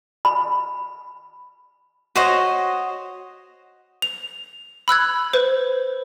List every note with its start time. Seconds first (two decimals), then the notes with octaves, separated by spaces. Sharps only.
0.25 B5
2.16 F#4 C5 C#5 D#5
4.02 F7
4.88 B5 E6 F#6 G#6
5.33 B4 C5